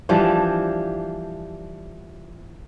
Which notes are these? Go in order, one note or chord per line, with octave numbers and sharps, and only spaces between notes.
E3 F3 G3 D4